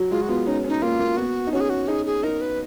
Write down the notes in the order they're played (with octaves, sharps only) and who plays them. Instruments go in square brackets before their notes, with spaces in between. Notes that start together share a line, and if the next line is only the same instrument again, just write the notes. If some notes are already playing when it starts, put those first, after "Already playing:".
Already playing: [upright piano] F#3
[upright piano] G#3 [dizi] F4
[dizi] F#4
[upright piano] B3 [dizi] F4
[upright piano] C#4 [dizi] D#4
[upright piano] C#4
[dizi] D#4
[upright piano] A#3 [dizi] F4
[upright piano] A#3
[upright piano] B3 [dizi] F#4
[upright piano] D#4
[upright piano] C#4 [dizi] F#4
[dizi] G#4
F#4
[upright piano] D#4 [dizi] G#4
[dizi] G#4
[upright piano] D#4 [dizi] A#4
[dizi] B4